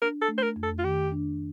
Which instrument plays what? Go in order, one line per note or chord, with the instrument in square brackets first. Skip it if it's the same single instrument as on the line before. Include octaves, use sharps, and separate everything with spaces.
[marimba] D4 [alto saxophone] A#4
[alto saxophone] A4
[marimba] A3
[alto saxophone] C5
A#4
[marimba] F2
[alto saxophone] A4
F4
[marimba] D#3 [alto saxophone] G4
[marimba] D4